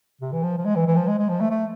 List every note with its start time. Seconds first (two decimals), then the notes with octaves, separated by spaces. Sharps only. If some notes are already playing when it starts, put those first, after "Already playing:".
0.21 C3
0.33 E3
0.43 F3
0.58 F3
0.65 G#3
0.76 E3
0.87 E3
0.97 F3
1.08 G#3
1.19 G#3
1.29 F3
1.40 A3
1.51 A3